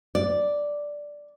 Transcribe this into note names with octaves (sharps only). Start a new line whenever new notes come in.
D5